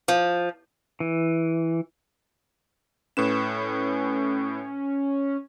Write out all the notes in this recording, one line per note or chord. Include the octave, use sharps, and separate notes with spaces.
F3
E3
A2 C#4 B4 E7